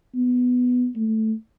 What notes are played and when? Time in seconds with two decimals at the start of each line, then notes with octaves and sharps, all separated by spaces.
0.15 B3
0.96 A3